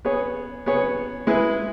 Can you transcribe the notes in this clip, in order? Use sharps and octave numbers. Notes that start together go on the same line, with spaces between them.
B3 G#4 C#5
B3 G#4 C#5
G#3 E4 G#4 B4